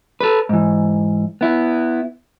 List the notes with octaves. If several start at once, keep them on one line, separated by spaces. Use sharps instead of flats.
A4 B4
G#2 E3
B3 E4